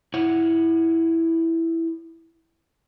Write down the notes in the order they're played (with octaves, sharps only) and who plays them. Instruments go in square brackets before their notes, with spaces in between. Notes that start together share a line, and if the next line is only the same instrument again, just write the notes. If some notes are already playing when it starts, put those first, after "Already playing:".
[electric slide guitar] E4 C#5 F#5